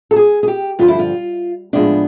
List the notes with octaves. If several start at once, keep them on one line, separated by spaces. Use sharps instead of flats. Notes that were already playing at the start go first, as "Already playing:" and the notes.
A4
G#4
G#4
G4
G2 D3 F3 F4
E4
F4
A2 F3 G#3 B3 D4